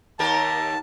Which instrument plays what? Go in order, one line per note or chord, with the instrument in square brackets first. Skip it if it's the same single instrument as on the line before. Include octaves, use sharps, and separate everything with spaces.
[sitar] D#2 G4 A#4 [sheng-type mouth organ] A5